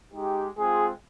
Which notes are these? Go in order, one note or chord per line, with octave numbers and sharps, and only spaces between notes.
G#3 D#4 G4
G#3 C4 F4 G#4